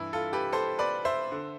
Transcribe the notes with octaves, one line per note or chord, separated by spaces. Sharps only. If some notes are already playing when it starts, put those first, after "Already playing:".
Already playing: G2 E3 E4
F4 A4
G4 B4
A4 C5
B4 D5
C5 E5
D3